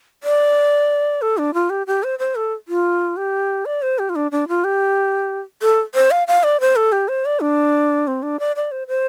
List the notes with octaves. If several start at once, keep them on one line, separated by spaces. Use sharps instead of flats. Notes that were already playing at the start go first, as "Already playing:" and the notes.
D5
A4
D4
F4
G4
G4
C5
C5
A4
F4
G4
D5
C5
G4
F4
D4
D4
F4
G4
A4
C5
F5
F5
D5
C5
A4
G4
C5
D5
D4
C4
D4
D5
D5
C5
C5